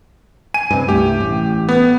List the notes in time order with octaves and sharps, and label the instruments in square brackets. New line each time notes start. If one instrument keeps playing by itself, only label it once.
[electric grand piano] G#5 D#7
[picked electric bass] G2 C3
[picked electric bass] C2 G2 A3 [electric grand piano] G4
[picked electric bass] A1 A2
[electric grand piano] B3